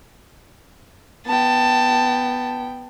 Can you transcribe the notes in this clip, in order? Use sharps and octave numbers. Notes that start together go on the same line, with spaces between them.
B3 G5 A5